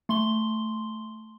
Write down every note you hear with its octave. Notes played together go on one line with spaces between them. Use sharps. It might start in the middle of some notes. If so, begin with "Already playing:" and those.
A3 C6 G7